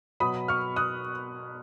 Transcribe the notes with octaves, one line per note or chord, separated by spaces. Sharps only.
B2 F#3 B5 D#6
C#6 F6
D#6 F#6